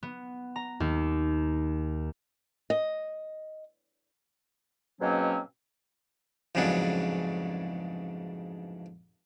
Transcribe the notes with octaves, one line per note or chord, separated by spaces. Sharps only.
B3
A#5
D#2
D#5
G#2 B2 F#3 A#3 C4 C#4
A1 F2 G#2 C#3 F#3 D4